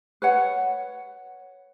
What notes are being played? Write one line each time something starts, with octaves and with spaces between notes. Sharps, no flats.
B4 C#5 F#5